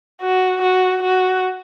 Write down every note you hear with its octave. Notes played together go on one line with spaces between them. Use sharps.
F#4
F#4
F#4